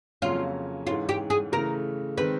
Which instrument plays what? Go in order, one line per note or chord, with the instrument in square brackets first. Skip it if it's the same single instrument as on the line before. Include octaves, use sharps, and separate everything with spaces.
[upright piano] F2 C#3 F#3 A#3 C#4 [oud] F4
[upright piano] G#2 E3 G#3 C#4 [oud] F4
[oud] G4
G#4
[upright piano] C#3 E3 A3 [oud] A#4
[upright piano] D#3 G#3 C4 [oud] B4